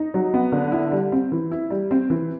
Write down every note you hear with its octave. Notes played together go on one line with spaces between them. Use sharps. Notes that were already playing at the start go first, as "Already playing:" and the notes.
Already playing: D#4
F#3
B3
D3
E4
G3
C4
E3
E4
G3
C4
E3